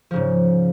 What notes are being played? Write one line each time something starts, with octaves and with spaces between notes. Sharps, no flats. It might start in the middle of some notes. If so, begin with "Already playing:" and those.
G#2 C#3 F3